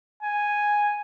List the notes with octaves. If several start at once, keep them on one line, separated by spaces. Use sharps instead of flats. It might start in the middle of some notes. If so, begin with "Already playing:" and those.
G#5